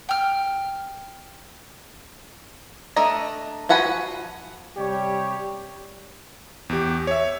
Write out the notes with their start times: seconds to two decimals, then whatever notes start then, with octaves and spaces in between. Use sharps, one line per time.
0.09 G5 F6
2.96 A3 D4 D#5 A#5
3.69 F3 F#4 F#5 G#5 B5
4.78 C3 G3 G4 C#5
6.69 E2 G4
7.07 C#5 E5